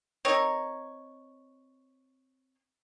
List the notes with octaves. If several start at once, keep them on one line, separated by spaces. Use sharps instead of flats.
C4 D#4 A#4 C#5